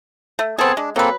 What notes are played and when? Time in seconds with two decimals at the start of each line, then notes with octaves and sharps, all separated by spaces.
0.39 A3
0.59 B3 C4 G#4 A4 A5
0.77 G#3 D4
0.96 F#3 A#3 C4 A4 B4